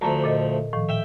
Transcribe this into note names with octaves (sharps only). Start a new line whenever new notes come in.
D2 F3 A3 A5 A#5
A#2 A4 D#5
A2 D#3 F3
E5 G5